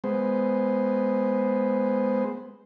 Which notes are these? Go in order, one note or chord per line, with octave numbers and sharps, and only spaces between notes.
G#3 B3 C5